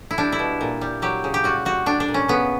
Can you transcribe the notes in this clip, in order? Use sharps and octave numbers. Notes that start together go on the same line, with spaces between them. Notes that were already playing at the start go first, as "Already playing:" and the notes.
E4
G3 D4
E4
B2
A#2
G3
F#3 G4
C#3
G4
G3 F#4
G3 F#4
G3 D4
D4
A#2
C#4
C#3 B3